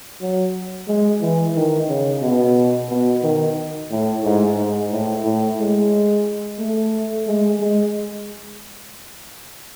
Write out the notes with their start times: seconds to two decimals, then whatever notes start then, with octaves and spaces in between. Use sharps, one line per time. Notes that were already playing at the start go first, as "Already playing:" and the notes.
0.21 F#3
0.88 G#3
1.21 E3
1.55 D#3
1.88 C#3
2.22 B2
2.90 B2
3.23 D#3
3.90 A2
4.24 G#2
4.58 G#2
4.91 A2
5.24 A2
5.59 G#3
6.59 A3
7.27 G#3
7.60 G#3